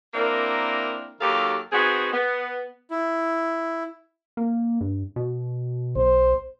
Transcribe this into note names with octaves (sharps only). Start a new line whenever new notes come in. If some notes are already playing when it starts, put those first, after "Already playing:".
A#3 C4 D4 E4 A#4
D#2 D#3 F#3 G4 A4 F5
B3 C4 D#4 F#4 G#4
B3
E4
A#3
G2
B2
B1 C5